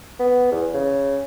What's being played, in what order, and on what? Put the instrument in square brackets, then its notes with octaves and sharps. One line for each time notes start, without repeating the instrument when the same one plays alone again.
[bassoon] B3
E2
C#3